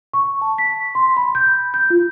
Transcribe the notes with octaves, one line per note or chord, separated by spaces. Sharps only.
C#6
A5
B6
C6
B5
G6
G6
F4